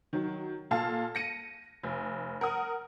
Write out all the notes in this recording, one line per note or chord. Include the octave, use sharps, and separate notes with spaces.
D#3 F#3
A#2 A4 F5 A5
A#6 C#7 D#7
F1
A#4 F#5 D#6